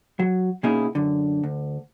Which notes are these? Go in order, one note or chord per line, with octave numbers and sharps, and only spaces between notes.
F#3
B2 A#3 C#4 D#4 E4 G#4
F#2 D3
D2